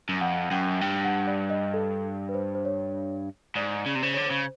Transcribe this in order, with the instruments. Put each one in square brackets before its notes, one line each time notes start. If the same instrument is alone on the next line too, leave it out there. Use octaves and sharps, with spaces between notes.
[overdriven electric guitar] F#2
[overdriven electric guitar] F2 [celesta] F#5
[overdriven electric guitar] F#2 [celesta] G5
[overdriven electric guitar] G2 [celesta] G5
[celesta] F#5
D5
D#5
A4
B4
C5
C5
C#5
[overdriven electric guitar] G#2 [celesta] D5
[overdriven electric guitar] C#3
C3
[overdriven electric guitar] C#3 [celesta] C5
[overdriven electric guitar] D3 [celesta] C#5
[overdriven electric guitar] C#3 [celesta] C5